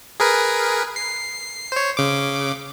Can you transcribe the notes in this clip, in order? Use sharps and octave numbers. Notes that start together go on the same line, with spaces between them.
G#4 A#4 B4
C7
C5 C#5
C#3 D6